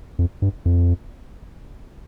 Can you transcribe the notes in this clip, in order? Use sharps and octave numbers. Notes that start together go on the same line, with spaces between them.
F2
G2
F2